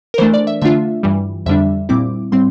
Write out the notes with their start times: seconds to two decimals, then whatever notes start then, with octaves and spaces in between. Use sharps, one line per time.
0.14 A#4
0.18 E3 A3 D4 C5
0.34 D5
0.47 E5
0.62 D3 A3 D4 F4 E5
1.03 G2 E3 G3
1.46 F2 D3 G3 D4 E5
1.89 A#2 G3 C4 E4 D6
2.32 A2 G3 C4 C6